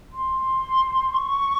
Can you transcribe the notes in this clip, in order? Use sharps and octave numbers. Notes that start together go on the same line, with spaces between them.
C6
C#6